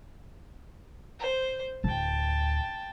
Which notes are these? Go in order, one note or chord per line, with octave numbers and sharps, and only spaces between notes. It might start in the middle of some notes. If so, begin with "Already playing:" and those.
C5
D1 D2 G5 A5